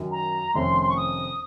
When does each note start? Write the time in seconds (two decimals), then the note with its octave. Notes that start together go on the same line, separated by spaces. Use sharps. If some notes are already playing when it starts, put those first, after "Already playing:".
Already playing: F#2 D#3 F#3
0.12 A#5
0.54 F1 F2 D#3 A3 C#4 C6
0.82 C6
0.89 C#6
0.97 D#6